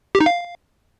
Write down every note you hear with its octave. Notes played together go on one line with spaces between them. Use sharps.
G4
D#4
F5